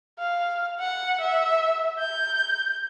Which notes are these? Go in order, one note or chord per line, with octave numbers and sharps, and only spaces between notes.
F5
F#5
E5
G6